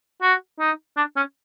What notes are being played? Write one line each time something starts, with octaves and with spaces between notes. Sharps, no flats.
F#4
D#4
D4
C#4